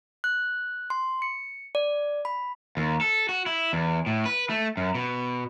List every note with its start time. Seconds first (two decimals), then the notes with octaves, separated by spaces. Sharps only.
0.24 F#6
0.90 C6
1.22 C#7
1.75 D5
2.25 B5
2.77 D#2
3.01 A4
3.29 F#4
3.46 E4
3.73 E2
4.06 A2
4.26 B4
4.50 A3
4.77 F#2
4.95 B2